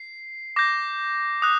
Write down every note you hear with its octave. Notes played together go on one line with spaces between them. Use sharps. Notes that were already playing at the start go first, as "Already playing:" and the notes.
Already playing: C7
D6 G6 A#6
D#6 F#6